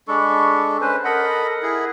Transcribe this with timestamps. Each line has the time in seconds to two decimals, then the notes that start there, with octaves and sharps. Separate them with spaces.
0.08 G#3 D4 A4 B5 C#6
0.81 C#4 B4 C5
1.05 A4 A#4 D#5 F#5 B5
1.63 E4 G#4